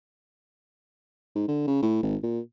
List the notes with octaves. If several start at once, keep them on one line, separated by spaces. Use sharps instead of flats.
G#2
D3
C#3
A2
G#1
A#2